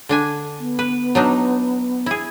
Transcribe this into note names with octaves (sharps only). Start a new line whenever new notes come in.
D3 D4 G#5
B3
B4
F#3 D4 D#4
E4 G#4